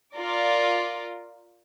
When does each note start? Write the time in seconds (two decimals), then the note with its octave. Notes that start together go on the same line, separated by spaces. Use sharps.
0.16 F4 A#4 D5